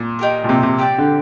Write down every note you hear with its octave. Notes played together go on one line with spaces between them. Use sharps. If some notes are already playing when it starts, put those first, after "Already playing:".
Already playing: A#2
D#4 G4 A#4
A#2
C3
C3
C4 G4 D5 G5
D3